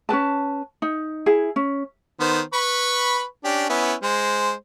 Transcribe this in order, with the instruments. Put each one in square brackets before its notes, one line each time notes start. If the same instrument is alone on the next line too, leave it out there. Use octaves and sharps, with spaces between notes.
[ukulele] C#4 A#4 B4 A5
D#4
E4 G#4
C#4
[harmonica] D#3 B3 C5
B4 B5 C#6
C#4 D4 G4
B3 C#4 E4
G#3 C5